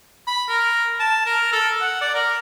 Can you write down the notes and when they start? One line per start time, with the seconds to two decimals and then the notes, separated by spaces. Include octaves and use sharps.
0.27 B5
0.49 A#4
0.99 A5
1.26 A#4
1.52 A4
1.81 F#5
2.01 D5
2.14 A#4